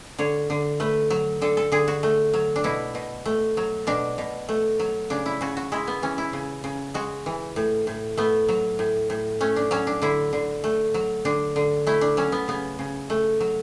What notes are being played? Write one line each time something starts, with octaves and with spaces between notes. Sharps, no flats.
D3 C#5
D3
A3 B4
F#3
D3 A4
A4
D3 G#4
F#4
A3
F#3
D4
B2 E4
B2
A3
F#3
B2 D4
B2
A3
F#3
C#3 D4
E4
C#3 F#4
F#4
G#3 E4
B3
E3 C#4
E4
C#3
C#3
G#3 F#4
E3
A2
A2
A3 B3
F#3
A2
A2
A3 C#4
D4
F#3 C#4
D4
D3 E4
D3
A3
F#3
D3 D4
D3
A3 E4
D4
F#3 C#4
B3
C#3 B3
C#3
A3
F#3